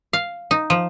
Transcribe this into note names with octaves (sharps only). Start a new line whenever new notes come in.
F5
D#4
F3